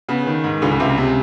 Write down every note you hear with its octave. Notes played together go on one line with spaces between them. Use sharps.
C#3 B3
D#3
G#2
C#2 D3
C#3
C#2 C3
C#3
C3